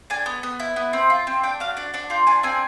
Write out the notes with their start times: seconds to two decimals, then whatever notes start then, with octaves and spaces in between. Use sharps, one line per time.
0.10 D4 G#5
0.26 B3
0.43 B3
0.60 E4
0.76 B3
0.93 C4
1.10 F4
1.27 C4
1.43 D4 G5
1.60 F#4 F5
1.77 D4 F#5
1.94 D4 F#5
2.10 F4 G5
2.27 D4 G#5
2.43 C4 G#5